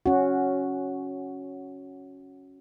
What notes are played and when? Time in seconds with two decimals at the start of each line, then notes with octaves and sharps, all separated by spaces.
0.06 C#4 F#4